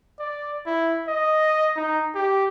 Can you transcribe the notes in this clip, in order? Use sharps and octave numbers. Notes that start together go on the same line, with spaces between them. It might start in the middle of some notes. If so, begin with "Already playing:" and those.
D5
E4
D#5
D#4
G4